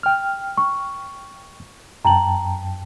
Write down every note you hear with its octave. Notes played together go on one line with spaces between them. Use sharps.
G5 F6
C#6
F#2 G5 A5 A#5 F#7